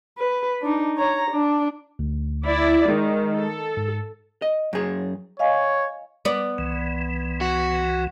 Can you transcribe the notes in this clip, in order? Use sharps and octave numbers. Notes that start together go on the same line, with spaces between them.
B4
D4 D#4
C#5 A#5
D4
D2
E4 D5
D#3 G#3
A4
G#2
D#5
F#2 G#4
C#5 D#5 F5 G#5
B3 D5
C2 E3
F#4